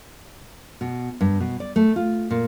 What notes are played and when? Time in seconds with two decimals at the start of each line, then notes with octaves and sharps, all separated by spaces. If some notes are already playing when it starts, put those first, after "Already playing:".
0.81 B2
1.21 G2
1.40 B2
1.60 D5
1.76 A3
1.96 F4
2.30 A#2